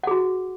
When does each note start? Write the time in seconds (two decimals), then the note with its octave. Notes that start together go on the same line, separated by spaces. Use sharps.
0.04 F#5
0.07 G#4
0.11 F#4